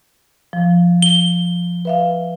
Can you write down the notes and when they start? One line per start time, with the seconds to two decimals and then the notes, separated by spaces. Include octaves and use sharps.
0.53 F3
1.02 G7
1.85 B4 E5 F5